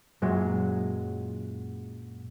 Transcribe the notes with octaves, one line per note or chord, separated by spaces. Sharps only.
F#2 A#2 F#3 G#3